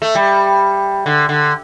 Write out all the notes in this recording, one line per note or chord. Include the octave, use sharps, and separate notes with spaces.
A3
G3
D3
D3